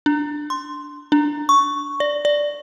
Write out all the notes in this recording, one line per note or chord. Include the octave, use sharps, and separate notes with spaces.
D4
C6
D4
C#6
D5
D5